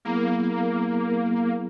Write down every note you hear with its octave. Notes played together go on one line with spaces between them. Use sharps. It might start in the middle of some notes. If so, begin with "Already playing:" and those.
F#3 A#3 B3 E4 G#4